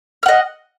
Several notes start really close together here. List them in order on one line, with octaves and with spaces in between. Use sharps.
F6 F#5 D#5